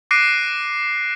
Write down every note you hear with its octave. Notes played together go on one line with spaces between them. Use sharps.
D6 F#6 A#6 C7 D7 D#7